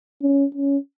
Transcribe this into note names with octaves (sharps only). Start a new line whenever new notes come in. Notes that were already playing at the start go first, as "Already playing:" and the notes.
C#4
C#4